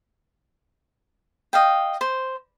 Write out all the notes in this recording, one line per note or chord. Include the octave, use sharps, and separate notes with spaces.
D#5 F5 G5
C5